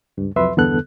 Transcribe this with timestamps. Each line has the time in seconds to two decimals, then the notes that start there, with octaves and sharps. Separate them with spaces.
0.17 C#2 G2
0.36 C2 F2 F#3 B4 E5 C6
0.57 E2 G2 D3 B3 A4 F#6